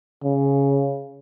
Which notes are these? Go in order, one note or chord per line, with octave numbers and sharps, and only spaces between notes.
C#3